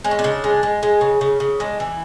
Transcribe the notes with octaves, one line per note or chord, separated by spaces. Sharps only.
G#3 D4
C#4
D4
C#3
G#3
G#3
G#3
C#3
C#3
C#3
G#3 D4
E3